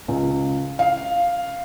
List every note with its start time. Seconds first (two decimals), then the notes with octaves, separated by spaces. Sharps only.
0.08 C#2
0.79 F5